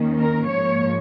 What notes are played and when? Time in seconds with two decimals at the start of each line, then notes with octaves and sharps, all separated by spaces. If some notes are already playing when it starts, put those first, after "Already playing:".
Already playing: D#2 D#3 A#3 C#4
0.18 A#4
0.47 G#2 F3 A#3 C#5